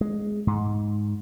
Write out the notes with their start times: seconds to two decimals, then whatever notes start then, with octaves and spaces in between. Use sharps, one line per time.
0.01 G#3
0.47 G#2